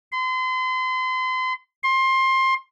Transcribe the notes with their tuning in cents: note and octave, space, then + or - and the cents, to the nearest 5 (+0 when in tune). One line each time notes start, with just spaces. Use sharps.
C6 -35
C6 +20